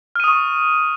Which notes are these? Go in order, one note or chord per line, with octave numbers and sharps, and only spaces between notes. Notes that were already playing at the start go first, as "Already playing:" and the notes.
C#6 D#6 F6 D#7